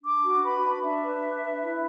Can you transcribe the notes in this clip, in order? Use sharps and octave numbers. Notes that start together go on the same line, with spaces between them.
D4 D6
F#4
B4 B5
D4
D4 E5
B4
D4
B4
E4